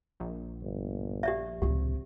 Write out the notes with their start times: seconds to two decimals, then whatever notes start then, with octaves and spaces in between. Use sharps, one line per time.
0.20 A#1
0.63 G1
1.23 G4 D5 E5
1.62 C#2 A2 C3 G4